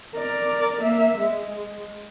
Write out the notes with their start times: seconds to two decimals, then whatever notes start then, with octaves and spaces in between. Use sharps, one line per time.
0.15 A#4 D5
0.81 A#3 E5
1.18 G#3